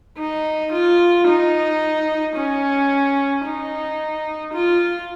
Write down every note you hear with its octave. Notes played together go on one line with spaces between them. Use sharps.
D#4
F4
D#4
C#4
D#4
F4